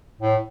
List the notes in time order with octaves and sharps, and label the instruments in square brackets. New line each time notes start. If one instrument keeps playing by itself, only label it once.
[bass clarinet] A2